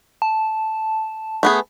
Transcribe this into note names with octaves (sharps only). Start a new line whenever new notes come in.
A5
A3 B3 G#4